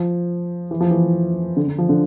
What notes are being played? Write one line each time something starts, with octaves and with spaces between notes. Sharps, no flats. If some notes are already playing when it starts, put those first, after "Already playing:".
Already playing: F3
E3
F3
E3
D3
D3
F3
D3